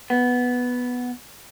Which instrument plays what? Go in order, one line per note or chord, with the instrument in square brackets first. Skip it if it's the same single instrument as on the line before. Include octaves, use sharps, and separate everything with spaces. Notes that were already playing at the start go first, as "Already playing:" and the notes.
[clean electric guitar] B3